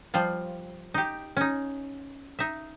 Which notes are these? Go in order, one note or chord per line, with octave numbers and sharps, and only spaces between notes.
F3 G3 F4
D#4 G4
C#4 D#4
D#4 E5